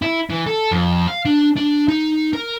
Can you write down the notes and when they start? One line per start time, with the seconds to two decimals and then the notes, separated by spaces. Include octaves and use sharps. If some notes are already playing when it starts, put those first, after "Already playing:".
0.02 E4
0.30 E3
0.47 A4
0.71 F2
1.07 F5
1.25 D4
1.57 D4
1.88 D#4
2.33 A#4